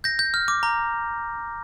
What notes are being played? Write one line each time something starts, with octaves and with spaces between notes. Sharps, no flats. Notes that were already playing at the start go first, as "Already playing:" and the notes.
G6 A#6
G6
F6
D6
A#5